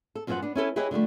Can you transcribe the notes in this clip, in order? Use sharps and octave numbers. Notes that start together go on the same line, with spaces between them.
A4
F#2 F3 B3 G#4 C5 F#5
B3 D4
C#4 E4 A4 B4
E4 G4 G#4 B4 C#5 D#5
D3 F3 G3 A3